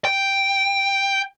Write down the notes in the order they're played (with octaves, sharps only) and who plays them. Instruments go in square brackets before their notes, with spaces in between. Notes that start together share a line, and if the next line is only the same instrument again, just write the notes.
[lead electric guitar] G5